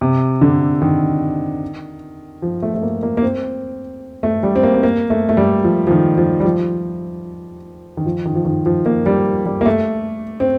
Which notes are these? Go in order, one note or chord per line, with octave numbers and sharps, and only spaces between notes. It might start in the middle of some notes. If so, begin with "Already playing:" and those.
C3
D3
D#3
F3
A3
A3
A#3
A#3
A#3
C4
A3
G3
C4
A#3
C4
A#3
A3
A3
G3
F3
F3
D#3
F3
G3
F3
D#3
F3
D#3
F3
D#3
F3
A#3
G3
G3
A#3
A3
C4